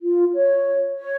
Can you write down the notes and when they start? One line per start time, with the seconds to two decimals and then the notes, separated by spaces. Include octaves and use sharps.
0.02 F4
0.34 C#5
0.97 C#5